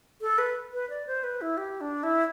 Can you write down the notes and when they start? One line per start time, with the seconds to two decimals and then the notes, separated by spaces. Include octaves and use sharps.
0.21 A4
0.38 B4
0.73 B4
0.90 D5
1.07 C5
1.24 B4
1.41 E4
1.57 G4
1.81 D4
2.03 E4